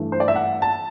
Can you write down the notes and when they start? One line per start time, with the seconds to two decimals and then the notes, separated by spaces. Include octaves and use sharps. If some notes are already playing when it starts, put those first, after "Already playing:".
Already playing: G2 E3 A3
0.12 C5
0.20 D5
0.28 E5
0.36 F#5
0.62 A5